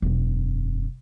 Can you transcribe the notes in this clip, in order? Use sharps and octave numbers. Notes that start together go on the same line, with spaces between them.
E1 F#2